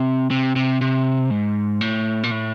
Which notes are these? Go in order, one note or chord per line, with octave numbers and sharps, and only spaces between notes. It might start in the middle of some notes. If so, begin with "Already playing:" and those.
Already playing: C3
C3
C3
C3
G#2
A2
A#2
A2